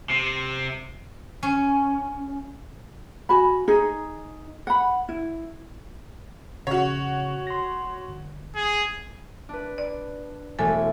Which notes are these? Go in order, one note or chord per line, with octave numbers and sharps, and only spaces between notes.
C3
C#4
F#4 G#5 B5
D#4 G#4
F#5 B5
E4
A#1 C#3 F#4 C#5
C6 A#6
G1
G#4
D4 B4
D5
E1 A3 A4 G#5 G#6